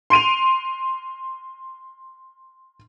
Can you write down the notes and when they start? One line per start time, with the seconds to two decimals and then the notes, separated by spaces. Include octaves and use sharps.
0.10 C6 D7 D#7 F7